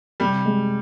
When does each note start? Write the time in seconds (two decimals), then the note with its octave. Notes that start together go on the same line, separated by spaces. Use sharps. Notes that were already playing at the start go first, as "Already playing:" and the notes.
0.20 C3 G3
0.46 G#3